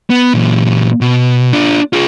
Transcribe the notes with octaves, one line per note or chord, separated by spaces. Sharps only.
B3
A#2 E3
B2
D4 F4
F4 G#4